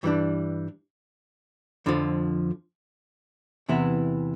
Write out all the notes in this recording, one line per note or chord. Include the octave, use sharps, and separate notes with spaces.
G2 E3 G3 D4
F2 D3 F3
E2 C3 E3 B3 E4